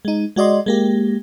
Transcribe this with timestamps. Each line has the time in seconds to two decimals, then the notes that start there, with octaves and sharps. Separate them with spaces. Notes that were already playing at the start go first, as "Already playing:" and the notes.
0.05 G#3 D#4
0.36 G#3 F#4 D5 D#5 C6
0.66 G#3 A#3 G4